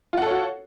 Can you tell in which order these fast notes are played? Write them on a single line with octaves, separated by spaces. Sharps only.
F4 F#5 A4 C#5 F#4